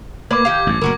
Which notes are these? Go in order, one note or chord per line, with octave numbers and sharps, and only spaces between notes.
A#3 B4 D5 D6 G#6
D#3 G4 F5
A1 G2
F#1 A#2 A#3 F#4 A#4